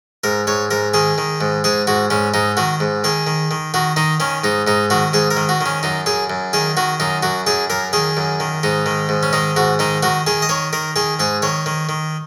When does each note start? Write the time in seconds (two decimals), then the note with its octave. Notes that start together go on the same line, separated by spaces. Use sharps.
0.24 G#2 A#4
0.47 G#2 C#5
0.71 G#2 A#4
0.94 D#3 G#4
1.18 D#3
1.41 G#2
1.64 G#2 G#4
1.87 G#2 F#4
2.10 G#2 C#4
2.34 G#2 D#4
2.57 D#3 F#4
2.80 G#2
3.04 D#3 G#4
3.27 D#3
3.51 D#3
3.74 D#3 F#4
3.96 D#3 D#4
4.20 D#3 C#4
4.44 G#2 D#4
4.67 G#2 D#4
4.90 D#3 F#4
5.13 G#2 G#4
5.31 A#4
5.37 D#3
5.49 F#4
5.61 D#3 C#4
5.83 F#2 D#4
6.06 F#2 G#4
6.30 F#2
6.53 D#3 G#4
6.77 D#3 F#4
7.00 F#2 D#4
7.23 F#2 F#4
7.47 F#2 G#4
7.70 F#2 A#4
7.93 D#3 G#4
8.17 F#2
8.40 D#3
8.63 G#2 D#4
8.86 D#3
9.09 G#2
9.23 C#4
9.33 D#3 D#4
9.56 G#2 F#4
9.79 D#3 D#4
10.03 D#3 F#4
10.27 D#3 G#4
10.42 D#5
10.49 D#3 C#5
10.73 D#3 A#4
10.96 D#3 G#4
11.19 G#2 G#4
11.42 D#3 C#5
11.66 D#3
11.89 D#3